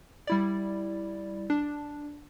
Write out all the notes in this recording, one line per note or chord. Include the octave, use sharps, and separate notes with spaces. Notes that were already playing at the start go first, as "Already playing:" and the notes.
G3 E4 D5
D4